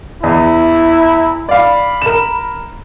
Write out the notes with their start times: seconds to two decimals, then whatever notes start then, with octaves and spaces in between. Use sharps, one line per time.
0.23 E2 E4
1.49 D5 F5 B5
2.02 A#4 E7